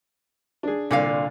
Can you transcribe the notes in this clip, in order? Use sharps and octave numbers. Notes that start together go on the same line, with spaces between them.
D4 G#4
C2 A#2 D3 F5